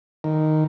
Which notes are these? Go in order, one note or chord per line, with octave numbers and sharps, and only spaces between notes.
D#3